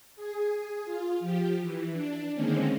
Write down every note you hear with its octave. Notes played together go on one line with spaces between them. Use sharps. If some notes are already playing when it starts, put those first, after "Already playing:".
G#4
F4
F3 G4
E3
D4
D3 D#3 G#3 A#3 C4 C#4